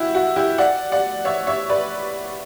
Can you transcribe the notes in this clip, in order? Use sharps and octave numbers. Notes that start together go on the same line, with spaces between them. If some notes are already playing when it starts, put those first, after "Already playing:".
Already playing: E4 F#4 G4
F#4
E4 G4
D5 F#5
D5 F#5
C#5 E5
C#5 E5
B4 D5